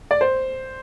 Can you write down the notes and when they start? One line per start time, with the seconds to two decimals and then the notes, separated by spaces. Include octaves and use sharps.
0.11 D5
0.21 C5